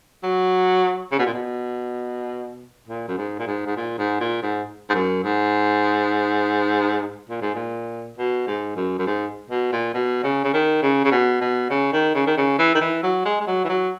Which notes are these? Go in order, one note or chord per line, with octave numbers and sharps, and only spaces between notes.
F#3
C#3
B2
A#2
B2
A#2
F#2
G#2
A#2
G#2
G#2
A#2
G#2
A#2
G#2
G#2
F#2
G#2
A#2
G#2
A#2
B2
G#2
F#2
F#2
G#2
B2
A#2
B2
C#3
C#3
D#3
C#3
C#3
B2
B2
C#3
D#3
C#3
D#3
C#3
E3
D#3
E3
F#3
G#3
G#3
F#3
E3
F#3